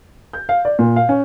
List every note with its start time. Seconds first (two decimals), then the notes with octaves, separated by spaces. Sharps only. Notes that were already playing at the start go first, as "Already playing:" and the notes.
0.33 G6
0.49 F5
0.65 D5
0.79 A#2
0.96 F5
1.09 C#4